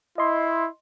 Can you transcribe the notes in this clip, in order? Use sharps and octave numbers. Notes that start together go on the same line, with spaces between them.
E4 D#5 C6